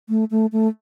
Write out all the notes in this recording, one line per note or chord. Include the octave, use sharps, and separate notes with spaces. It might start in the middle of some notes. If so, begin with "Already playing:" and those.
A3
A3
A3